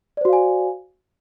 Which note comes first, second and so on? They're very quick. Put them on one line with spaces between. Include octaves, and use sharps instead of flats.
D5 C5 F#4 F5 G#5